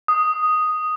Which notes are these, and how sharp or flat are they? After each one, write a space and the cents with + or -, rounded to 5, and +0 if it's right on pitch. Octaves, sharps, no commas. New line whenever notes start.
D#6 +0